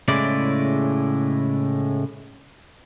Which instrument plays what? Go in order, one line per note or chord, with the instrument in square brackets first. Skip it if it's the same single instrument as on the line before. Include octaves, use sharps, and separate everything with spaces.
[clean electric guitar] A2 C#3 G#3 E4 D5